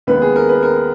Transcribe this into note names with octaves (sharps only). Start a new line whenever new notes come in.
D#2 D#3 G#3 B3 B4
G#4
A#4
B4
A#4